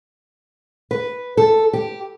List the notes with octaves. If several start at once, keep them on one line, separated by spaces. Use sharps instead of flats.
B4
A4
G4